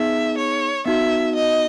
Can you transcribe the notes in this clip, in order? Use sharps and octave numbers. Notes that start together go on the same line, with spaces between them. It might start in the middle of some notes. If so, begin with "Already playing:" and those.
Already playing: B3 D#4 G#4 E5
C#5
B3 D#4 F#4 E5
D#5